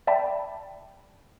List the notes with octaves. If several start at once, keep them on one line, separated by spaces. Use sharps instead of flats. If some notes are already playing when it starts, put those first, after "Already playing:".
D5 E5 G5 A5 B5